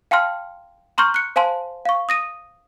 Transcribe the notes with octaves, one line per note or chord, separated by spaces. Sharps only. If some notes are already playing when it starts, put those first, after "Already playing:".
F5 G5 A5 C6 F6
A#5 C6 C#6 F6 G6
F#6 C#7
C5 F5 G#5 A5 C6
F5 C#6
D#6 A#6 D#7